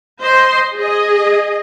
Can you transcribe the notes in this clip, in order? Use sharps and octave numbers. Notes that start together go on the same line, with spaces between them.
C5 D#5 C6
G#4 D#5